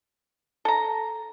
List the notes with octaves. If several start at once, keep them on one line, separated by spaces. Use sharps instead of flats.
A4 A#5